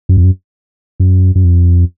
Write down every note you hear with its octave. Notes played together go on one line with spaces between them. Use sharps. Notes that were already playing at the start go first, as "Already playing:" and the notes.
F#2
F2
F#2
F#2
F#2
F2